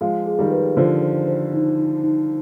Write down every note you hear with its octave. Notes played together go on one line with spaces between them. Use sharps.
F3 G#3 F5
G#4
D#3 G3
B4
D3 F3 C5
C5
C5
D#4
D#4
D#4